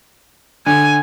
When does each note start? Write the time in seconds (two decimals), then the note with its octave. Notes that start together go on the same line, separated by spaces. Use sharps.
0.66 D3 G#5